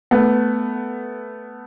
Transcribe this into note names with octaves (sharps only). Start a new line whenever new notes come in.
A3 B3